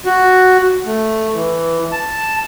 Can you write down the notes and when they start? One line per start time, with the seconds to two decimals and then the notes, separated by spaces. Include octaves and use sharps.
0.06 F#4
0.86 A3
1.34 E3
1.92 A5